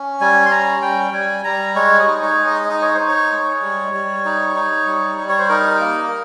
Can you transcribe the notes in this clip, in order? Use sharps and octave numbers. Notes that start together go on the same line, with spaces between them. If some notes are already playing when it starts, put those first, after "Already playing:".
Already playing: C#4
G3 G#5
C6
C#4 A#5
G3 G5
G3 G#5
G3 A#5
G#3 C#5
D#5
D#4
C#5
G#3
D#5
D#4 D#5
C#5
C5
D#4
C#5
G#3
G3
G3
D#4
D#4
G3
G3
C#5
C5
D#4 A#4
A#3